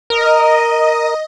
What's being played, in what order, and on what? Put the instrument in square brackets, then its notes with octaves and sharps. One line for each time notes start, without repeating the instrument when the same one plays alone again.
[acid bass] A#4 [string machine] D#5